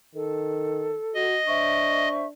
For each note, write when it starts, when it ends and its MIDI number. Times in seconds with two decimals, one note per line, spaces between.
0.15 0.96 51
0.15 1.24 69
1.15 1.38 66
1.15 2.09 75
1.47 2.33 62
1.47 2.25 72
1.47 2.25 76
1.47 2.25 85